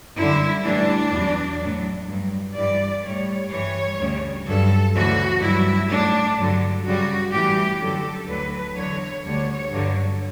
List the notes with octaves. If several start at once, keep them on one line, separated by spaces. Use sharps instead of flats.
F#2 D3 G3 E4
A2 E3 G3 D4
E2 B2 F#3
F#3
A2
G2 F#3
G2 E3 G3 D5
A2 G3 C#5
G2 E3 G3 C#5
D2 C#3 G3
G2 F#3 A4
D2 C#3 E3 F#4
G2 F#3 E4
A2 F#3 D4
G2 D3 F#3
F#2 C#3 G3 F#4
A2 E3 G3 G4
F#2 D3 F#3 A4
D2 D3 F#3 B4
E2 D3 F#3 C#5
D2 D3 G3 C#5
G2 D3 F#3